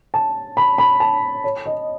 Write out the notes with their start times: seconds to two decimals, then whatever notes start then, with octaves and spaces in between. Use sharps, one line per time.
0.14 A5
0.57 B5
0.78 B5
1.00 A5
1.44 C#5
1.66 D#5